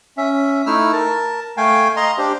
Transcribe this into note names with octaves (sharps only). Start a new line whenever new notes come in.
C#4 E5
A3 D#4 E4 E6 F6
A#4 A5
A3 F5 G5 G#5
D#5 F5 A#5 C6
D4 G4 C5